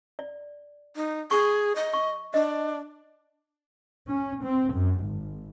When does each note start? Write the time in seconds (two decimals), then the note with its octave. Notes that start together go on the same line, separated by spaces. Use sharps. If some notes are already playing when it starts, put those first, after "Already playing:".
0.19 D5
0.96 D#4
1.31 G#4 C#6
1.76 D#5
1.94 C#6
2.34 D4 D#5
4.08 C#4
4.41 C4
4.73 F#2
5.03 G#1